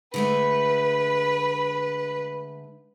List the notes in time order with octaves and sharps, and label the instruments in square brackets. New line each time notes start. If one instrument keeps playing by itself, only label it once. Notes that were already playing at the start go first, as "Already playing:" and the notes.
[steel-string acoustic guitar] D3 G#3 A3 [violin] B4